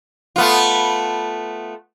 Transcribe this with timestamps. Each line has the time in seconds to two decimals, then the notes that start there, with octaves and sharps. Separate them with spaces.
0.36 A3 B3 F4